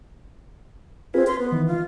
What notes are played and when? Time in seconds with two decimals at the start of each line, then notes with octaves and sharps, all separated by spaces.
1.14 C4 F4 G#4 B4
1.27 B4 C6
1.39 B3
1.52 D#3 E3
1.67 F4